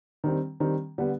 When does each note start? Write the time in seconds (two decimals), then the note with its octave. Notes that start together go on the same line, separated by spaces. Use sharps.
0.24 D#3 G3 C4
0.60 D#3 G3 C4
0.98 D3 G3 B3